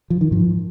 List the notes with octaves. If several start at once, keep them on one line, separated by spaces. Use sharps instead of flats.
F3
D#3
G#2 F3